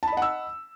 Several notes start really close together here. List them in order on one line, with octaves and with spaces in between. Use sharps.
A5 B5 D#5 F#5 E6